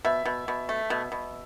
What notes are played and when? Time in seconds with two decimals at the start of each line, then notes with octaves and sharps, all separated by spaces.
0.05 B2 E5
0.25 B2
0.48 B2
0.69 A3
0.90 B2
1.12 B2